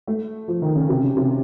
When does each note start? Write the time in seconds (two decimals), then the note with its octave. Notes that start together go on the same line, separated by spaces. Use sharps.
0.07 A3
0.48 F3
0.62 D#3
0.75 C#3
0.89 C3
1.03 C#3
1.17 C3